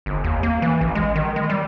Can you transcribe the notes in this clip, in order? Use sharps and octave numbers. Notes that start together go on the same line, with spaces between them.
G1
D#2
A#3
E3
A1
G#3
D#3
G#3
G3